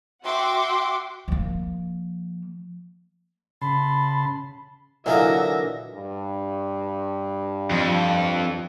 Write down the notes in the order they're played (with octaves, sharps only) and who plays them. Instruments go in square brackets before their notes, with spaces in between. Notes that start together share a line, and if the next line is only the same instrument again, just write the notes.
[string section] F#4 E5 F#5 G5 C6 D6
[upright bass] F3 A#3
[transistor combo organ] C#3 A5 C6 [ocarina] B5
[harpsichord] A#2 D#4 F5 [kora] D3 E3 F#3 [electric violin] E5 A#6
[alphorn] G2
[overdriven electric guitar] F2